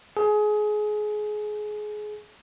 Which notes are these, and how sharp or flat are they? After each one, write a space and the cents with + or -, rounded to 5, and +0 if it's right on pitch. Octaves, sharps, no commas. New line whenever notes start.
G#4 +25